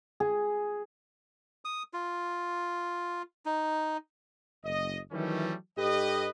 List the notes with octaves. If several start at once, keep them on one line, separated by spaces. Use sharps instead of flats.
G#4
D#6
F4
D#4
F#1 D#5
D#3 E3 F#3 G3 A3 C#4
G2 G4 A4 B4 D#5